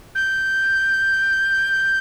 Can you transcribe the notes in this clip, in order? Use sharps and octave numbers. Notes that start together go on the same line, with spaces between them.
G6